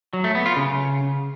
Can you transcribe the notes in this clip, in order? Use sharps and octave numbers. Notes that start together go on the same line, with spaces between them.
F#3
A3
B3
F4
C#3